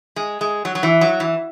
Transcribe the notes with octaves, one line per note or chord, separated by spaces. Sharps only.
G#3
G#3
F#3
F#3
E3
F#3
E3